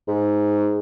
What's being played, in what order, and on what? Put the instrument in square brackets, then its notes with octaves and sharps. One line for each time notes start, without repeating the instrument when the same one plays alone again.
[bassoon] G#2